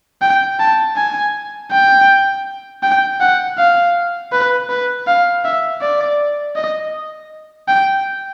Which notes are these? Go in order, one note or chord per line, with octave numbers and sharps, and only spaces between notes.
G5
A5
G#5
G5
G5
F#5
F5
B4
B4
F5
E5
D5
D#5
G5